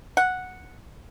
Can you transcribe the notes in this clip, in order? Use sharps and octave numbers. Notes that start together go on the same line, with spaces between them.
F#5